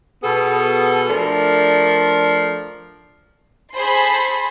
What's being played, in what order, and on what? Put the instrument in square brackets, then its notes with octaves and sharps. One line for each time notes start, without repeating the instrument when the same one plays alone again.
[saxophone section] B2 B3 G#4 A4
F3 A3 D4 A#4
[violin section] G#4 A4 C5 B5 C6